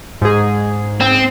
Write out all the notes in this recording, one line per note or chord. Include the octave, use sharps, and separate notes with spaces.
G#2 G#4
C4